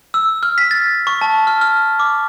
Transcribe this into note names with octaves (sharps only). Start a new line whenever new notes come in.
E6
F6
B6
A6
C#6
A5
F6
F6
D6